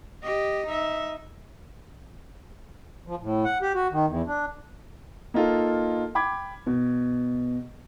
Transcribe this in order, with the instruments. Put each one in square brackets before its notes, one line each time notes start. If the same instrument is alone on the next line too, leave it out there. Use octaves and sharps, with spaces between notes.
[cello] G4 D#5
D#4 E5
[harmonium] F3
A2
F#5
G4
F#4
D#3
E2
D4
[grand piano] A#3 D#4 F4 A4
G5 B5 D6 G#6
B2